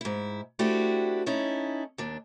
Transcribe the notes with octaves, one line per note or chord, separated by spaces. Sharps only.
G#2 E4
A3 C4 D4 E4 F#4 G4
C#4 D#4 E4 A4
D#2 D4